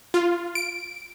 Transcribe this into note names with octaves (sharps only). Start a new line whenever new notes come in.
F4
D7